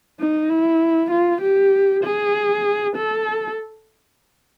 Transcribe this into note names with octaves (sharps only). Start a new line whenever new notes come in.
D#4
E4
F4
G4
G#4
A4